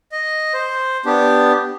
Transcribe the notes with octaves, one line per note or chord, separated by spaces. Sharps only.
D#5
C5
B3 D4 G4